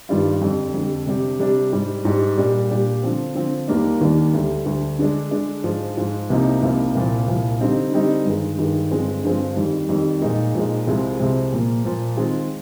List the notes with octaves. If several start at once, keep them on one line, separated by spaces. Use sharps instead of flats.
G2 D#3 G3 D4 F4
F2 D3 G3
F2 D3 G3
C3 G3 D4 G4
C3 G3 D4 G4
G#2 G3 D4 G4
G#2 G3 D4 G4
A#2 G3 D4 G4
A#2 G3 D4 G4
D3 F3 C4
D3 F3 C4
D#2 D#3 G3 A#3 D4
D#2 D#3 G3 A#3 D4
D2 D3 G3
D2 D3 G3
D3 G#3 D4
D3 G#3 D4
G#2 F3 G#3
G#2 F3 G#3
C2 C3 F3 A#3 D#4
C2 C3 F3 A#3 D#4
C2 A#2 F3
C2 A#2 F3
D3 G3 C4 D#4
D3 G3 C4 D#4
G2 D#3 G#3
G2 D#3 G#3
G2 D3 F3 G#3 C4
G2 D3 F3 G#3 C4
F2 D#3 G3
F2 D#3 G3
A#2 F3 G#3 D#4
A#2 F3 G#3 D#4
C2 C3 F3 G#3 C4
C2 C3 F3 G#3 C4
A#2 F3 A#3
A#2 F3 A#3
D#3 G#3 C4 F4 G#4